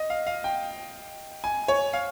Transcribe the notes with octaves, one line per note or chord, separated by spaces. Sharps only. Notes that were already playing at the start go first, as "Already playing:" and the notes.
Already playing: D#5
F5
F5
G5
G#5
C#5
F5